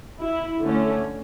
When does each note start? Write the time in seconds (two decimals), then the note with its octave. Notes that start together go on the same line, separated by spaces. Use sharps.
0.20 E4
0.61 D3 A3 C#4